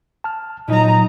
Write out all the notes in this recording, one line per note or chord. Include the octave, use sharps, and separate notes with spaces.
A5 F6
A#2 F#3 D#4 A#5